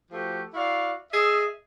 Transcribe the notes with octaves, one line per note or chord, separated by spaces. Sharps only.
F3 A3 F#4 G4
E4 F#4 D5 F5
G#4 D#5 E5